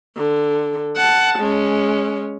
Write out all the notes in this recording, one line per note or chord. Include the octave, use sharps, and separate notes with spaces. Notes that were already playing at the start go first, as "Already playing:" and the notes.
D3
F#5 A5
G#3 C#4